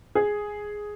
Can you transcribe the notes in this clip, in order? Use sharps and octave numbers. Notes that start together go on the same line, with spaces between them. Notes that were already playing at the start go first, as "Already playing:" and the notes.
G#4